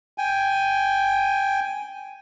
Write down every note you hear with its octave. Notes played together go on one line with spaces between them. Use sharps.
G5 G#5